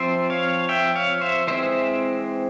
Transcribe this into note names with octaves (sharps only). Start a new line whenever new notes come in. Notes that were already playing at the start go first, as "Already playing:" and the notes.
Already playing: F3 C4 C5 E5
C#5 F5
E5 G5
C#5 F5
C5 E5
E3 G#3 C4 C5 E5